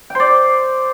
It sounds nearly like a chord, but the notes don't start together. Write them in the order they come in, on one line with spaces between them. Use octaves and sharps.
G5 C5 D5